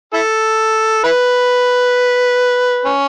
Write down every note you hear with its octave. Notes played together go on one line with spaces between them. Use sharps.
E4 A4
E4 B4
C#4